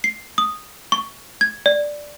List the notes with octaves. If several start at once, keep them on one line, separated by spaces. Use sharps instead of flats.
C7
D#6
C#6
G#6
D5